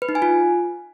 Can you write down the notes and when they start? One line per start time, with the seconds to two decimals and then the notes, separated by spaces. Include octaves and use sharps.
0.02 B4
0.09 D#4
0.15 G#5
0.22 F4